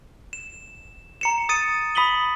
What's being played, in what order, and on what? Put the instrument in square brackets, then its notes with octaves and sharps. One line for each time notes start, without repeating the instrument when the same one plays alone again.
[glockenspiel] E7
A#5 C#7 E7
D#6 A6 C#7 D#7
B5 D#6 B6 D#7 F#7 G7